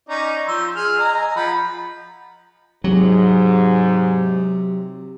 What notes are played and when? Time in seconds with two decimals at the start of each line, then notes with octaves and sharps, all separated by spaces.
0.09 C#4 D#4 D5
0.48 F3 C6 E6
0.75 G#4 E6 F6
0.99 D#5 G#5 A#5
1.36 F3 F#5 B5
2.84 G#2 C3 F#3